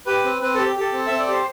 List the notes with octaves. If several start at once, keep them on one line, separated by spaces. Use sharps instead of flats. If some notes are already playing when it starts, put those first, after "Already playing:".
G4 B4
C4
C4 B4
G4 A4
G4 A4
C4
C4 E5
D5
G4 C5